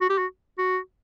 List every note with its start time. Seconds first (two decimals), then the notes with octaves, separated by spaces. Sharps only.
0.01 F#4
0.10 G4
0.18 F#4
0.58 F#4